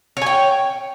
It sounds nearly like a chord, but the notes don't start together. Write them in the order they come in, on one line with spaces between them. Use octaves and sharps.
C#5 G#5 G5